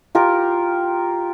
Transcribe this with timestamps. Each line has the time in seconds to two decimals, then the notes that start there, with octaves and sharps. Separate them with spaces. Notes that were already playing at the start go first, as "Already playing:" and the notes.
0.15 F4 G4 A#4